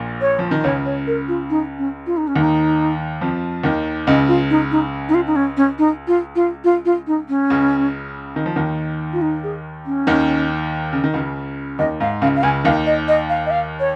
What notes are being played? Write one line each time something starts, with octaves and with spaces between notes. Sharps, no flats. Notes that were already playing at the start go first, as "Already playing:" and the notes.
Already playing: A#1 A#2
C#5
F3
D#3
C#2 C#3 C#5
C#5
A#4
F4
D#4
C#4
F4
D#4
C#4
D#2 D#3 D#4
F2 F3
D#2 D#3
C#2 C#3 D#5
F4
D#4
D#4
D#4
F4
D#4
C#4
C#4
D#4
F4
F4
F4
F4
D#4
C#4
C#2 C#3
D#3
F3
D#2 D#3
F4
D#4
G#4
C#4
D#2 D#3
C#3
D#3
C#2 C#3
D#2 D#3 D#5
G#2 F5
C#2 C#3 F5
F5
C#2 C#3 G#5
D#2 D#3 F5
D#5
D#5
F5
D#5
F5
C#5